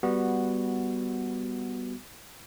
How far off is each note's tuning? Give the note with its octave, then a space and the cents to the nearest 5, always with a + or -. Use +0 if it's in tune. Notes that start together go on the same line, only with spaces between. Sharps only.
G3 +0 B3 +0 F#4 -5